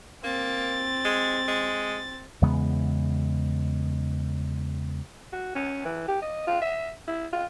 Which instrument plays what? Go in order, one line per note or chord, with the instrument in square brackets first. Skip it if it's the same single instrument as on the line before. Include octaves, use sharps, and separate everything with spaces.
[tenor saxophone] A#3 [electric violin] C4 A6
[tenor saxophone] G#3
G#3
[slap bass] E2 C#3 G#3 B3
[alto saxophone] F#4
C#4
E3
G4
D#5
F4
E5
E4
F4